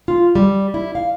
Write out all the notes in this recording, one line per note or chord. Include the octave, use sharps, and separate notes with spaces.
F4
G3
E4
F5